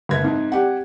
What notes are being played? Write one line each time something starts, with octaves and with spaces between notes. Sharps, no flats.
F#1 G#3 B4 E5 G#6
G#2 C4
C4 G4 D5 F#5